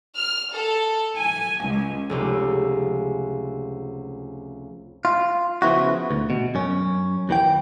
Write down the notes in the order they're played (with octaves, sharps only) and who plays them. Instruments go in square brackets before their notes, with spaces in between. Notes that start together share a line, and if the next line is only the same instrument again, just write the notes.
[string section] F6
A4
G#5
C#2
[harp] F1 C#2 G4
[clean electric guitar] F4
C#3 F3 B3 E4 F#4
D2
B2
F#2 C#4
D#2 E3 G5